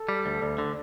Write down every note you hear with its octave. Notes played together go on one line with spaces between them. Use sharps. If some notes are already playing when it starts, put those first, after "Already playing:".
Already playing: A4
G3
D2
D2
D3